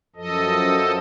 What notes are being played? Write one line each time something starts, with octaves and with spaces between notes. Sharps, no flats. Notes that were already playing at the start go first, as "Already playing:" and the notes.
F#2 F3 A4 D#5